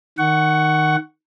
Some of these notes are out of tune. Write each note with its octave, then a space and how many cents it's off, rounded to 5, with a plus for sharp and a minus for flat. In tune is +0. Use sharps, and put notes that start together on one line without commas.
D#3 -5 F#5 +15 C#6 +0